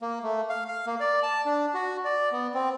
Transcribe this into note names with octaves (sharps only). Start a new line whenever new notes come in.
A#3
A3
F5
F5
A#3
D5
A5
D4
F#4
D5
B3
C4